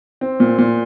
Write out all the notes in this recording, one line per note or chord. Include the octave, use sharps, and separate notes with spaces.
C4
A#2
A#2